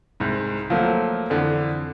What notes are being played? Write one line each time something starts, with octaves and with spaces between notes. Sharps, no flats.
C2 G#2
F3 F#3 A3 A#3
F2 D3 E3